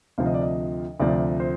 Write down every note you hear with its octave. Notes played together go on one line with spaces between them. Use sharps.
D2 C3 F3 F5
D#5
D5
D#5
D2 C3 F3 D5
C5